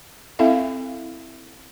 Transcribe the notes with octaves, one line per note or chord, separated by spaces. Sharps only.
C4 E4 A4 E5 F5